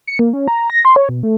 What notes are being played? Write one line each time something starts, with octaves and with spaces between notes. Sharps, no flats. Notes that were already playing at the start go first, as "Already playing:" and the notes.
C#7
A#3
C#4
A#5
A#6
C6
C#5
B2
A3